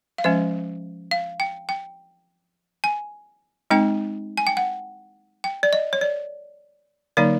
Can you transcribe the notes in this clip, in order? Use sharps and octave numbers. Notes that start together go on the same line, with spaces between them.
F5
F3 G#3 C#4 E5
F5
G5
G5
G#5
G#3 C4 D#4 G5
G#5
G5
F#5
G5
D5
D#5
C#5
D5
D3 F#3 A#3 D#4 D5